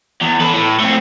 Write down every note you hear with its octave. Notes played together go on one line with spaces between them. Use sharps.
E2
A4 B4
A2
A3 C4